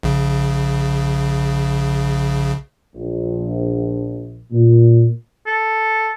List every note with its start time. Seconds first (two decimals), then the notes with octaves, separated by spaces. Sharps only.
0.03 A#1 C#3
2.95 A#1
4.52 A#2
5.47 A4